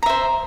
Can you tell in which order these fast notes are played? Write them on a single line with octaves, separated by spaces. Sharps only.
A#5 E5 C5